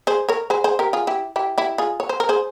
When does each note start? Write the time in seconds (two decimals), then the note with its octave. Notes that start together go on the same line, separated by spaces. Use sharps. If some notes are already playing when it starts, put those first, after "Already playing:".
0.07 G#4 C5
0.29 A#4 C#5
0.50 G#4 C5
0.64 G#4 C5
0.79 G4 A#4
0.93 F4 G#4
1.07 E4 G4
1.36 E4 G4
1.58 E4 G4
1.78 F4 G#4
2.00 C#5
2.09 C5
2.20 A#4
2.29 G#4 C5